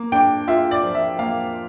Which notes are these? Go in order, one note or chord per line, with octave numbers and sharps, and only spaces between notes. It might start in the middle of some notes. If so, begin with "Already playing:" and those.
Already playing: A#3
D4 G5
F4 E5
D5
F3
E5
A#3 F5